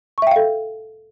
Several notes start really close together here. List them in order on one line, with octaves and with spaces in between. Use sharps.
C#6 E5 G5 F5 A4